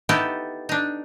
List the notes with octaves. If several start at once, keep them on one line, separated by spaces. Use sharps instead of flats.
B3 D#4 E4 G4 A4
D4 D#4